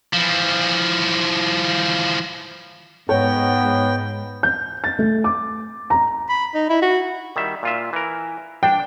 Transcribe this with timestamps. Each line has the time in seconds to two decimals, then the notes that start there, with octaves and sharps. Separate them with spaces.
0.13 E3 F3
3.09 G#2 B3 C#5 G5
4.43 G6
4.84 A6
4.99 A3
5.24 D6
5.90 A#5
6.29 B5
6.54 D#4
6.70 E4
6.82 F#4
7.36 D#3 G3 E5
7.63 A#2 F4 E5
7.93 E3 A#4
8.63 D4 G5